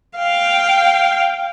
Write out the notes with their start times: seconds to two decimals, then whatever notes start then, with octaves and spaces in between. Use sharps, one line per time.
0.18 F5 G5